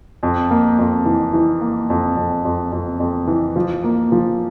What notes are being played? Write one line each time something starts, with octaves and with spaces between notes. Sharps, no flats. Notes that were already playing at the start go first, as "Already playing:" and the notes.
F2
A#3
F2
E3
E3
A#3
F2
F2
F2
F2
F2
E3
F3
A#3
F3